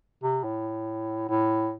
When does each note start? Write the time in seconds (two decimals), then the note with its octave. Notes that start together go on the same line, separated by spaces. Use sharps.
0.23 C3
0.43 A2
1.29 A2